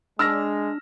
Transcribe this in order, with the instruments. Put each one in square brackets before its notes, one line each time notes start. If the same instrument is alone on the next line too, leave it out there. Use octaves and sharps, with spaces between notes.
[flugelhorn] G#3 [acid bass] D4 [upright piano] E6 F6 A#6